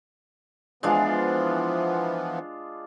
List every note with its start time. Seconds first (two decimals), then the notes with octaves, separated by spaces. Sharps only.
0.83 E3 F3 G#3 B3 D4 F4